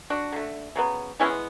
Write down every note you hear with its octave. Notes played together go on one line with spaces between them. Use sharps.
D4 F#4
D3 A3
C#3 F#3 B3
E3 G#3 B3 C#4 E4